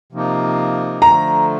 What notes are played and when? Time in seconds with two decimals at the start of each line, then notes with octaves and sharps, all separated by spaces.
0.12 C3 F3 A#3 D#4
1.01 D3 F3 A3 A#5